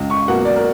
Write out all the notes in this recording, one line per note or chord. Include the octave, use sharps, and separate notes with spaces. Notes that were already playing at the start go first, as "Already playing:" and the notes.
Already playing: C#2
C#6
B2 F#3 A#3 F#5
D5
A#4